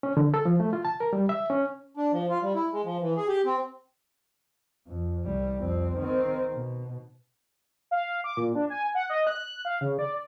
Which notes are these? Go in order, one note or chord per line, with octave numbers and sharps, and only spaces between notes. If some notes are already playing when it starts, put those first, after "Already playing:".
C#4
D3
A4
F3
A3
F4
A5
A#4
G3
E5
C#4
D4
F3
F4
G3
E4
G#3
F3
E3
G#4
G4
C4
F2
C2 G3
F2 C4
D#3 C4
B2
F5
D6
A#2
D4
G#5
F#5
D#5
F#6
F5
C#3
D5